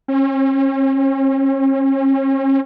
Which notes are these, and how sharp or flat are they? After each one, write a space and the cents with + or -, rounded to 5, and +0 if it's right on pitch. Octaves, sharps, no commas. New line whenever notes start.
C#4 -40